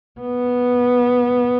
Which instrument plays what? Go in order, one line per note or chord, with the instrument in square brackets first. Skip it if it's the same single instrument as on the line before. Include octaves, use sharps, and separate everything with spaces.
[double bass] B3